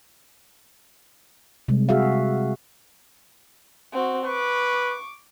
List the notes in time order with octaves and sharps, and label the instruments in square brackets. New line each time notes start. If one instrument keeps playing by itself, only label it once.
[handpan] C3 G3 G#3
F#4 G#4 E5 F5
[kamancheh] C4 F#4
[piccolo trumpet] B4 [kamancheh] C#6 D6